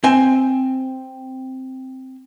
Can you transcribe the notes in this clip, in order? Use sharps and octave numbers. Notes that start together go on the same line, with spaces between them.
C4 C5 G#5